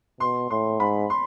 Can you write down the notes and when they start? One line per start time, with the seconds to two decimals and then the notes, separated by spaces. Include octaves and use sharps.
0.20 B2 C6
0.50 A2 C6
0.79 G#2 B5
1.10 C6